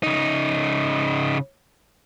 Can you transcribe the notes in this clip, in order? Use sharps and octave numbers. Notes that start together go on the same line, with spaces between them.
C#3 D#4